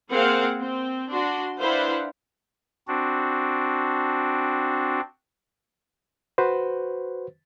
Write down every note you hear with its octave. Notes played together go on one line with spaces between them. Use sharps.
A#3 C4 G#4 C5 F5 F#5
C4
D4 F#4 C6
D4 E4 B4 C5 F5 F#5
C4 D4 F#4
F#4 B4 C5